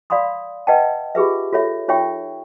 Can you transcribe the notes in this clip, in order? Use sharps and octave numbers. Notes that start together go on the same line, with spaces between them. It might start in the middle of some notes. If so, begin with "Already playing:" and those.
D5 F5 B5 C6 D#6
B4 D#5 E5 F#5 G5 A5
F4 G4 G#4 B4 E5
F4 A4 C#5 E5
D#4 F4 C#5 E5 G5 C#6